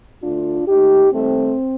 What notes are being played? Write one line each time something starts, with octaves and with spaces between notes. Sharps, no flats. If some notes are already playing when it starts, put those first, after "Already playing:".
D2 D3 A3 D4 F4
D#2 D#3 A3 D#4 G4
D#2 D#3 G3 A3 C4